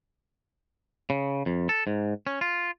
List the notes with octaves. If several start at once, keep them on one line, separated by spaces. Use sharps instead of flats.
C#3
F2
A4
G#2
C#4
F4